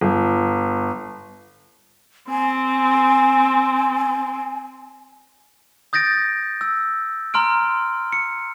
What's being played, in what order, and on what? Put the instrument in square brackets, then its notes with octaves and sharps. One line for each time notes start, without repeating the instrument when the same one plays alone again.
[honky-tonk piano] G1
[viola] C4 [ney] G#5
[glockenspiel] D#6 G6 A6 A#6 D7
E6
A#5 C6 F6 D7
C#7